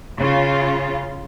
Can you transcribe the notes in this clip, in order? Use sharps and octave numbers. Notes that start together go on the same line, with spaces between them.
C#3 F4